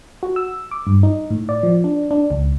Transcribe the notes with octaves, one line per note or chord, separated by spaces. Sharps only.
F#4
E6
D6
G2
D#4
A2
D5
F3
D4
D4
C#2